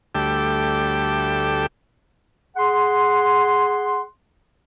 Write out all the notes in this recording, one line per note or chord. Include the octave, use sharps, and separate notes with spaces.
D2 G3 A3 G5 D6 E6
G#4 F#5 C6